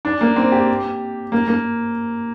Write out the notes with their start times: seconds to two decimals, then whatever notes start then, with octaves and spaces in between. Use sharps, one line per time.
0.05 D4
0.21 A#3
0.36 C4
0.52 G4
1.32 A#3
1.48 A#3